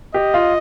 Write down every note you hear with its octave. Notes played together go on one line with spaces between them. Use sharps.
G4 D#5
F4